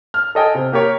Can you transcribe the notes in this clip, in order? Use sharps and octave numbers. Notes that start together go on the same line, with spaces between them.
F6
A4 D#5 G5 G#5
C3
A#3 G4 A#4 C#5